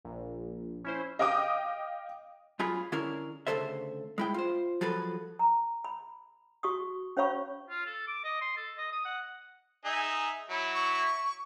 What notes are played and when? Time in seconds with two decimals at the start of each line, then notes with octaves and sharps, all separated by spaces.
0.05 A#1
0.84 C#4 E4 C5
1.19 D#5 F5 G5 D6 D#6
2.59 F#2 F4 G#4 B5
2.92 D3 C#4 E4 G#4 A#4
3.47 D2 G2 C#3 A4 C5 E5
4.18 G#3 E4 G5
4.34 F4 C5
4.81 F3 F#3 G#4 A4 B4
5.39 A#5
5.84 B5
6.63 F#4 C#6 D#6
7.17 C#4 C5 C#5 F5 B5 C#6
7.70 F4
7.86 A4
8.07 D6
8.24 D#5
8.41 C6
8.57 A4
8.78 D#5
8.92 D#6
9.05 F#5
9.85 D#4 G#4 E5
10.50 F#3 E4
10.75 C#6